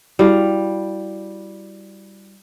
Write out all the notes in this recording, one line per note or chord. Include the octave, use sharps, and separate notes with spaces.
G3 E4 F#4 F5